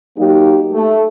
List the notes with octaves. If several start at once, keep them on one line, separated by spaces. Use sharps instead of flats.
F#3 A#3 D#4 G4
A3